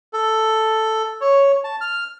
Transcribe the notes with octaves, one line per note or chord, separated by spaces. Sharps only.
A4
C#5
A5
F6